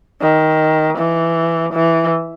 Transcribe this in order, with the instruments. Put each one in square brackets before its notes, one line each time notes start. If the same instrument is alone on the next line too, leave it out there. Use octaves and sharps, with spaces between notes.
[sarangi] D#3
E3
E3